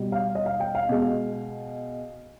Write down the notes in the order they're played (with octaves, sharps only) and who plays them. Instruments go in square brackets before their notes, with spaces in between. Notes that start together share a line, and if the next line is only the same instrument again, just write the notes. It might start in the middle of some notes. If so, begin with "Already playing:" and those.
Already playing: [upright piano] B2 G3
F5
D#5
F5
G5
F5
B2 G#3